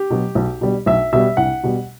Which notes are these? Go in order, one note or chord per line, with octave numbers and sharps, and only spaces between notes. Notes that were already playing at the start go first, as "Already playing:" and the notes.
Already playing: G4
B2 F#3
B1
B2 G3
B1 E5
B2 G3 E5
C2 F#5
B2 G3